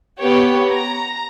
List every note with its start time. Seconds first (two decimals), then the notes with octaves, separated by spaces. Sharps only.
0.18 B3 G4 C#5
0.70 A#5